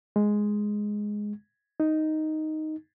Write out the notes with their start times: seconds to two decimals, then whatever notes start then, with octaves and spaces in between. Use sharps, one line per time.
0.16 G#3
1.80 D#4